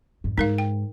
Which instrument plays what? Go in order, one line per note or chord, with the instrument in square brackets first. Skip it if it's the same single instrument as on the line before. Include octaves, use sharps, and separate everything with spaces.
[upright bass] F2 G#2
[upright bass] G#2 E3 [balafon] D#4 A#4 F5
[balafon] G5